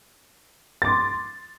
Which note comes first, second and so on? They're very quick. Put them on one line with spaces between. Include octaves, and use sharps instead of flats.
A6 D6 C6